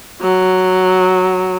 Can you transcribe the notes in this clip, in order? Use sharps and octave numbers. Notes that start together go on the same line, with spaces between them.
F#3